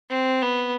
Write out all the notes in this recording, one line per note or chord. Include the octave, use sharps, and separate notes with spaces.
C4
B3